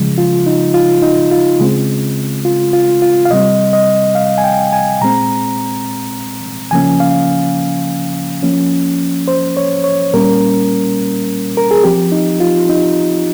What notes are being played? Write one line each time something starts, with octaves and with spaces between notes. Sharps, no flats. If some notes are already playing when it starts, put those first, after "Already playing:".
Already playing: C#3 F3 G#3
F4
D#4
F4
D#4
F4
C#3 G#3 C4
F4
F4
F4
F5
C3 G3 C4 D#5
D#5
F5
G#5
G5
G#5
A#2 G#3 C4 A#5
C#3 F3 A#3 C#4 G#5
F5
F3 A#3 C#4
C5
C#5
C#5
A#2 G3 A#3 C#4 A#4
A#4
G#4
F3 C4 G4
D#4
F4
D#4